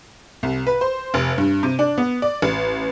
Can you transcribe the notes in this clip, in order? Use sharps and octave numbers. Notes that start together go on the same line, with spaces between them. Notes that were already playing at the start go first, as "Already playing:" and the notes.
C2
B4
C5
F1
G2
C3
D4
B3
D5
A1